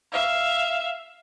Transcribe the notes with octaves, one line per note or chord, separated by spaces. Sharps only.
E5 F5